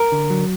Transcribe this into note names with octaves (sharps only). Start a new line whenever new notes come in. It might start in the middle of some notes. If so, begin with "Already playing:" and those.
Already playing: A#4
D3
F#3